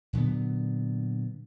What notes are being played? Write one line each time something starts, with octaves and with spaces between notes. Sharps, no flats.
A#2 D3 F#3 B3